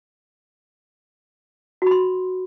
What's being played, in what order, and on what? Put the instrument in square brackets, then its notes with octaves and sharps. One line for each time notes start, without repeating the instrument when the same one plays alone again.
[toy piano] F#4
B5
C6